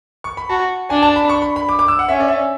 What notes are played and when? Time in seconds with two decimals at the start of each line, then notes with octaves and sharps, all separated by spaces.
0.24 C#6
0.37 B5
0.50 F#4 A5
0.90 D4 G#5
1.03 A5
1.16 B5
1.29 C#6
1.42 B5
1.56 B5
1.69 D6
1.79 D6
1.88 E6
1.99 F#5
2.09 C#4 E5
2.20 D5
2.28 E5